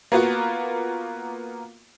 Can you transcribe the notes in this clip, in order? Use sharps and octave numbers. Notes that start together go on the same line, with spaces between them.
A#3 B3 F4 F#4